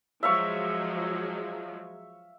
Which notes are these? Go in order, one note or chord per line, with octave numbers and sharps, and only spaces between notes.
F3 F#3 G#3 E5 F5 C#6